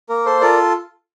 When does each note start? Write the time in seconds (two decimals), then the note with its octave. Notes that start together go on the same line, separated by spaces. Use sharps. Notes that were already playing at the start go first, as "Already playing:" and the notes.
0.09 A#3 A#4
0.26 A4 C5
0.41 F4 A4 A#4 D5